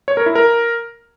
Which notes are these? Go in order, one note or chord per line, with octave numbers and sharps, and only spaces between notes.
C#5
A#4
E4
A#4